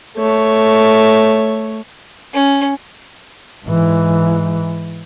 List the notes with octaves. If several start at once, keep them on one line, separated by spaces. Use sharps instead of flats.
A3 C#5
C#4
G#2 E3